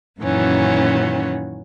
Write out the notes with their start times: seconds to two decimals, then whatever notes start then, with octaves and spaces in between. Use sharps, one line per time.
0.20 F#2 A#2 D#3 E3 C#4 F#4